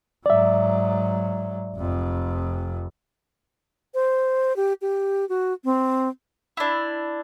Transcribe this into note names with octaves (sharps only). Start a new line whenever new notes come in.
G#2 F#3 D5 E5
F1 F2
C5
G4
G4
F#4
C4
D4 E4